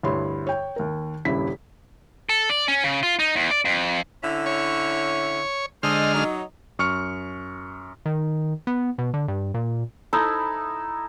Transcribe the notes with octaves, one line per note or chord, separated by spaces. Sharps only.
D2 G2 E4 C#5 C6
C#5 G5
D#2 A#4
D#1 G2 C#3 E4 B6
A4
D5
C#4
C#3
F4
D#4
E2
D5
F2
D3 C#4 E4
C#5
D3 G#3 A4 C5 D#5 F6
F#3 D#4
F#2 C#6 F6 C#7
D#3
B3
B2
D3
G2
A#2
D#4 E4 A4